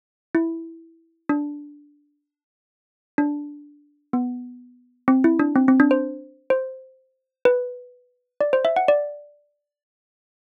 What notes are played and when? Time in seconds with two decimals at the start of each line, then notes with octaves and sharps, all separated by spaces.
0.35 E4
1.29 D4
3.18 D4
4.13 B3
5.08 C4
5.24 E4
5.39 D4
5.56 C4
5.68 C4
5.80 D4
5.91 C5
6.50 C5
7.45 B4
8.41 D5
8.53 C5
8.65 E5
8.76 F#5
8.88 D5